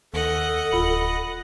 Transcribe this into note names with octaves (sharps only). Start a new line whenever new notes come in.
D#2 A4 D#5 F#5
D1 F4 B5